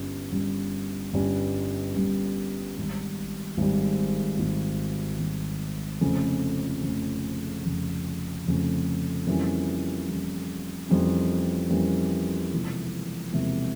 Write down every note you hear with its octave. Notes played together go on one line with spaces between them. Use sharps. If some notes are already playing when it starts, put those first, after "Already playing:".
Already playing: G1 G2 G3 C#4
G1 G2 G3 C#4
G1 G2 G3 C#4
G1 G2 G3 C#4
G#1 G#2 G3
G#1 G#2 G3
G#1 G#2 G3
G#1 G#2 G3
F1 F2 C#3
F1 F2 C#3
F1 F2 C#3
F1 F2 C#3
F2 E3 G3 A#3 C#4
F2 E3 G3 A#3 C#4
F2 E3 G3 A#3 C#4
F2 E3 G3 A#3 C#4
E1 E2 C3 F3 A#3
E1 E2 C3 F3 A#3